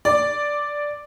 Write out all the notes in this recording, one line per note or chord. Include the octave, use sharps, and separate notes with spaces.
D5